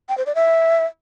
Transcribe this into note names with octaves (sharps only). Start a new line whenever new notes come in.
G5
C5
D5
E5